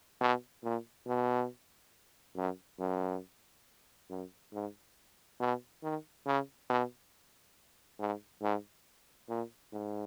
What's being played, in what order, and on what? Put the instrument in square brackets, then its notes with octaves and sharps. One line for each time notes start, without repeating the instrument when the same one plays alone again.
[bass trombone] B2
A#2
B2
F#2
F#2
F#2
G#2
B2
D#3
C#3
B2
G#2
G#2
A#2
G#2